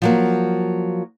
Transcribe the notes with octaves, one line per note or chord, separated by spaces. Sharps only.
F3 F#3 A#3